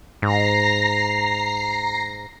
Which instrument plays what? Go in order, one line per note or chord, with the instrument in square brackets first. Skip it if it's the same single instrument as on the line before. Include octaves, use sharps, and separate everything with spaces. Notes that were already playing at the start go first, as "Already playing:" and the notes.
[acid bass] G#2 [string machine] A#5 A#6 C7